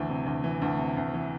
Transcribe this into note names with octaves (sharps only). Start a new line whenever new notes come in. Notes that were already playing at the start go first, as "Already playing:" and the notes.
Already playing: D2 E3
C3
D2
E3
D2
C3
D2
E3